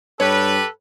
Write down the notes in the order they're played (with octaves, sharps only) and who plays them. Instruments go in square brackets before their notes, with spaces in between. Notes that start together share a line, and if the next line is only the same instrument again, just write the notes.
[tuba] G2 [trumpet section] G4 B4 [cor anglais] A4 [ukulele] C#5